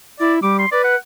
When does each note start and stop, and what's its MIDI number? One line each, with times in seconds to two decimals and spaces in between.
0.20 0.39 64
0.20 0.33 74
0.42 0.65 55
0.42 0.57 86
0.59 0.70 84
0.72 0.95 71
0.72 0.83 74
0.84 0.96 78